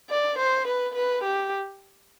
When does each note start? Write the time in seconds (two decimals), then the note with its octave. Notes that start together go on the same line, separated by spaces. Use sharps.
0.10 D5
0.39 C5
0.67 B4
0.95 B4
1.24 G4